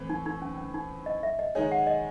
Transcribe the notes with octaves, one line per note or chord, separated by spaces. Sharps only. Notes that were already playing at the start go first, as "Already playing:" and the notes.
Already playing: A2 E3 C4
D#4
D#4
C#4
C#4
D#4
D#5
E5
D#5
D#3 G#3 D#4 G#4 C#5
F#5
D#5